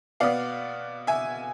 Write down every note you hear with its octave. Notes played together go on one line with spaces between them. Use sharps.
B2 B3 D5 F5
E5 G#5